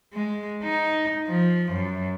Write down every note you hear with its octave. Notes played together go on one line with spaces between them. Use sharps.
G#3
D#4
F3
F#2